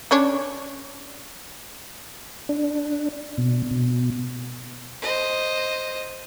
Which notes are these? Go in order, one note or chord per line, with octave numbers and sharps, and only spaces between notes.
C#4 D4 C#5
D4
B2
B2
C5 D#5